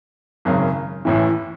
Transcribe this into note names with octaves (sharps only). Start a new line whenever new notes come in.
G#1 F#2 C#3
A1 A2 E3